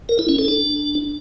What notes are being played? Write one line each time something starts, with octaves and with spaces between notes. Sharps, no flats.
A#4
E4
C#4
A4
D4